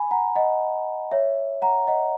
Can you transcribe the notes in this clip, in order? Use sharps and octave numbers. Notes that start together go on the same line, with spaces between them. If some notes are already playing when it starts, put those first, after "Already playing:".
Already playing: G#5 B5
F#5 A#5
D#5 F#5
C#5 E5
F#5 A#5
D#5 F#5